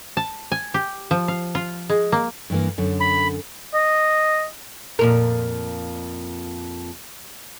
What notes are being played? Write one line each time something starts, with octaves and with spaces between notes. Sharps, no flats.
A5
G#5
G4
F3
F5
F4
G#3
A#3
G2 E3 A#3
F#2 D3
B5
D#5
F2 A#2 A#4